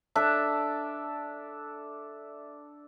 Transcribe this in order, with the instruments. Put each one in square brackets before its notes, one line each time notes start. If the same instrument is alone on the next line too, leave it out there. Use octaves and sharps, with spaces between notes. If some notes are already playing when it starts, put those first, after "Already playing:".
[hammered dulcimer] D4 A4 E5